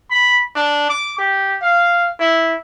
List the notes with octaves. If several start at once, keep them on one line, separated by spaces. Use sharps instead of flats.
B5
D4
D6
G4
F5
E4